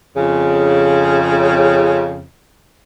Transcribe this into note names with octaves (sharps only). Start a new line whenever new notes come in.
F2 C#3